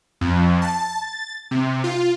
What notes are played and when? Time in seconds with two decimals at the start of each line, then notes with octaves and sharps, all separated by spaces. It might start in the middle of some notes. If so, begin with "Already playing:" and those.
0.21 F2
0.62 A5
1.02 A6
1.51 C3
1.84 F4